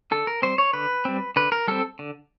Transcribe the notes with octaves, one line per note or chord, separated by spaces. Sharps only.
D3 A4
A#4
G3 C4 C5
C#5
D3 B4
G3 C4
D3 B4
A#4
G3 C4 A4
D3